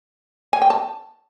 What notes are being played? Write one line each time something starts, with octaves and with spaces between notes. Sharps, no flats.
G#5
G5
A5